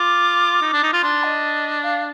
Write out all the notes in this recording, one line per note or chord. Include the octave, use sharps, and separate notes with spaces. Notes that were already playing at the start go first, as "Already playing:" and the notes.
Already playing: F4 D6
D#4
D4
D#4
F4
D4 C6
D#5
F5